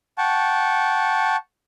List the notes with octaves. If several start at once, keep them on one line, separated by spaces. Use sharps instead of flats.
F#5 G5 A5 C#6